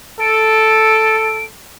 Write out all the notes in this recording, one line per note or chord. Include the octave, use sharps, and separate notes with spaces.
A4 D7